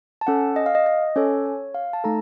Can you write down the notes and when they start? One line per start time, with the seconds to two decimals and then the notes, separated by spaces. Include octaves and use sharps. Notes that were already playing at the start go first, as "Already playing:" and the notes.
0.21 A5
0.27 C#4 A4 F#5
0.56 D#5
0.66 F5
0.75 D#5
0.86 D#5
1.16 C#4 A4 C#5
1.46 C#5
1.74 F5
1.93 A5
2.04 A3 D#4 A4 A#5